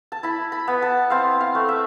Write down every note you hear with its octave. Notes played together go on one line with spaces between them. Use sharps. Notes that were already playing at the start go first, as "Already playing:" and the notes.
A5
E4 B5
B5
B3
A5
C4 F5
F5
A3
E5